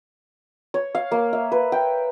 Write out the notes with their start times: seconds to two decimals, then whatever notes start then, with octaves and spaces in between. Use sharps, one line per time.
0.74 C#5
0.95 F5
1.11 A#3
1.33 E5
1.52 B4
1.72 G5